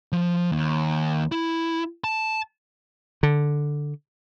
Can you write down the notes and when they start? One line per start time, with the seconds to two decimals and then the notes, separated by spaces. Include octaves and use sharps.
0.12 F3
0.52 D#2
1.32 E4
2.04 A5
3.23 D3